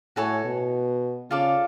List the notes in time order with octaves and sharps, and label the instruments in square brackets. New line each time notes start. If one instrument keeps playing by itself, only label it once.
[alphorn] A2 [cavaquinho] F#4 A4 C#5 G#5
[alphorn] B2
[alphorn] C#3 [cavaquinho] F4 A4 D5 F5